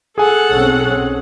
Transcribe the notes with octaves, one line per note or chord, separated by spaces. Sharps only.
G#4 A4 F#5 G#5
B1 C4 C#4